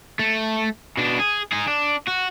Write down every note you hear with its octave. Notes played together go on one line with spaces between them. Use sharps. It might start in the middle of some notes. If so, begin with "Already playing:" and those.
A3
B2 D4
G#4
D#4 G#4
D4
F#4